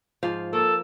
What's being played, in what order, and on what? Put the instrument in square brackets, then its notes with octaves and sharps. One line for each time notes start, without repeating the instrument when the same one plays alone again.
[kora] G#2 F3 F5
[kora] A#3 [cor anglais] A4